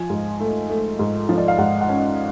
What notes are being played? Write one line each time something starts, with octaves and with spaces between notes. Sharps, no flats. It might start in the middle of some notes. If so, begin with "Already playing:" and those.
Already playing: F3 G#5
G#2
A3
A3
G#2
F3
D5
F5
G#2 F#5
F#5
C#4